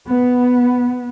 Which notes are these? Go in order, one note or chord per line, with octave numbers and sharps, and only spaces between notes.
B3